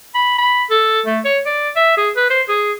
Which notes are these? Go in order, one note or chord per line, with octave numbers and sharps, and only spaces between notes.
B5
B5
A4
A3
C#5
D5
E5
G#4
B4
C5
G#4